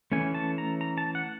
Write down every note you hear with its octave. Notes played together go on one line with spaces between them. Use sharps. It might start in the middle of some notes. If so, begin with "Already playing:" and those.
E3 A3 C#4 G#5
A5
A#5
A#5
A5
F#5